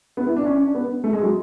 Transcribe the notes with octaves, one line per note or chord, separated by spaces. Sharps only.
B3
E4
D4
C#4
D4
B3
A3
G#3
F#3